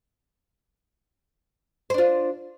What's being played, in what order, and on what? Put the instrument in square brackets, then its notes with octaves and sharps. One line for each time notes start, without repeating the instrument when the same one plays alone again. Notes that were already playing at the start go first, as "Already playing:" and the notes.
[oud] C5
D4
F4